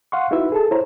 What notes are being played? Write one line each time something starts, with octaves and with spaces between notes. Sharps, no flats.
F5 F#5 C6 C#6
D#4 E4 F#4 B4 E5
G#4 A4 A5
E4 C5 C#5 A#5